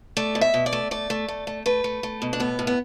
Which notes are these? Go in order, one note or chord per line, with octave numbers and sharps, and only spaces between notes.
A3 D5
B2
E5
B2
D5
A3
A3 D5
A3
A3
A3
A3 B4
A3
A3
B2
D4
A2 B3
A2
B3